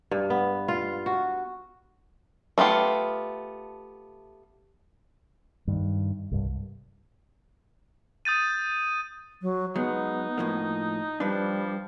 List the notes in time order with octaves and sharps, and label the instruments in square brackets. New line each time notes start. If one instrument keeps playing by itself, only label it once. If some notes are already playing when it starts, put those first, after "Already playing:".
[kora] G2
B3
F4
F#4
[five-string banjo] A3 B3 F4 G4
[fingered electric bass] G2 D#3
C2 G2
[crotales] D#6 G6 A6 D#7
[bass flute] F#3
[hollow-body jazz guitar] F#3 G#3 [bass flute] B3 [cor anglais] D#4
[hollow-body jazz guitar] A2 F3 A#3
[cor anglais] F3 [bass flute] G3 [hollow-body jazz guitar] D4 B4